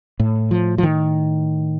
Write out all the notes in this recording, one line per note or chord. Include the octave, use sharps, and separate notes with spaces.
A2
F3
F3
D#3